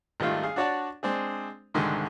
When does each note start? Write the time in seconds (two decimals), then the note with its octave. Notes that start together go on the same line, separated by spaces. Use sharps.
0.20 G#1 D#3 G3 A3 F4 F5
0.43 G#4 F5
0.56 D4 F#4 C#5 D5 F#5 A5
1.03 G#3 C4 D4 G#4
1.74 C2 G#2 D3 D#3 G#3